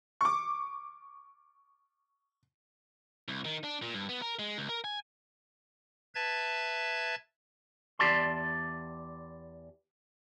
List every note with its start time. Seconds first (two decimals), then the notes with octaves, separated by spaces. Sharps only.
0.21 C#6 D6
3.28 C2
3.45 D#3
3.64 D4
3.82 A#2
3.94 G2
4.09 B3
4.22 A#4
4.39 G#3
4.58 C#2
4.69 A#4
4.84 G#5
6.15 B4 E5 A5 G#6 A6
7.99 E2 G4 D5 A5 C6